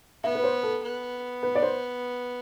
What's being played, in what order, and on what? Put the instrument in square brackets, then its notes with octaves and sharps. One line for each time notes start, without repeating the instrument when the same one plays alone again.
[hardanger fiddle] B3 [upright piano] E5
[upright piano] B4
C5
A4
[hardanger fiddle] B3
[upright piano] B4
D5
C5